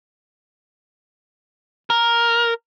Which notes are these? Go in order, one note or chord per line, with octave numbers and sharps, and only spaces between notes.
A#4